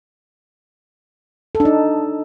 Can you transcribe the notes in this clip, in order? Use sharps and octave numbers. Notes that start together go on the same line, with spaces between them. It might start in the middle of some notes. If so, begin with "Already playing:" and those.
A4
D4
D#4